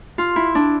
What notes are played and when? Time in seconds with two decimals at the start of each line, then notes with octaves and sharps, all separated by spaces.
0.18 F4
0.36 E4
0.55 D4